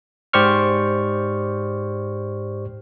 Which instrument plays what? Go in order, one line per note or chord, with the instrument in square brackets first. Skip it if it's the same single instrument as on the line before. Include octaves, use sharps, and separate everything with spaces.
[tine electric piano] G#2 G4 C5 D5 C#6 F6